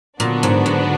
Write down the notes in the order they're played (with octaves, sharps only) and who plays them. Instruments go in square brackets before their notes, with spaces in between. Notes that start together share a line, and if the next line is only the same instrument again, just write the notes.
[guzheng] A#2 [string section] D3 F#3 B3 D4 F#4
[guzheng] G#2
G#2